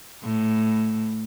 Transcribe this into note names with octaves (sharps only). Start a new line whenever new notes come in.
A2